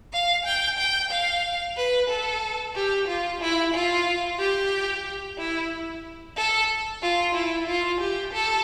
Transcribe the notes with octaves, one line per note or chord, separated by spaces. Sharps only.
F5
G5
G5
F5
B4
A4
G4
F4
E4
F4
G4
E4
A4
F4
E4
F4
G4
A4